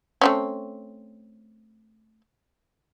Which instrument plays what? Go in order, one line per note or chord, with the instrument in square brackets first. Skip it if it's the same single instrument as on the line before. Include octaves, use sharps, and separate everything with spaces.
[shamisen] A3 C4 C#4